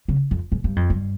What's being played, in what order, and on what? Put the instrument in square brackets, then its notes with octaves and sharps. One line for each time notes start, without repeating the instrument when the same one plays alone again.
[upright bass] C#3
F2
G#2
G2
F2
G2